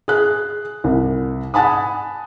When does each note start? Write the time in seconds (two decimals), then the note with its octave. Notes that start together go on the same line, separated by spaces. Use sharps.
0.08 G#4 F#6
0.84 C2
1.54 F#5 G#5 A5 B5 D#6